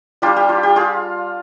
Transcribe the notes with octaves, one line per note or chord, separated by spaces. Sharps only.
G3 D4 F4 G4
G4
F4
G4
F4 G#4